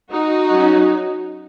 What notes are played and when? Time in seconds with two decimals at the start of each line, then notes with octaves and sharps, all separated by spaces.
0.10 D#4 F#4
0.51 F#3 C#4